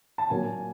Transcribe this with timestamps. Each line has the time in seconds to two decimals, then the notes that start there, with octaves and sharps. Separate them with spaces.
0.18 A5
0.30 A#2 F#3 A#3 G#5